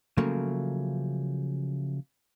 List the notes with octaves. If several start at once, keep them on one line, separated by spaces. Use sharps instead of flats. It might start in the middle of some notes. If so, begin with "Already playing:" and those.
C#3 F3 F#3 A3 A#3